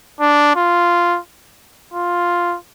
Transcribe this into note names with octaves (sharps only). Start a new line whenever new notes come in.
D4
F4
F4